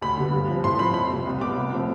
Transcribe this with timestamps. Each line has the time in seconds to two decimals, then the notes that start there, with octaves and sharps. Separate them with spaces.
0.01 D2 B5
0.18 D3 G3 B3
0.33 G2
0.48 F3 C4
0.64 A2 C6
0.79 F3 C4 B5
0.94 F2 B5
1.10 C3 G3
1.26 C2
1.40 B2 B3 D6
1.56 C2
1.72 C3 F3 A3 C4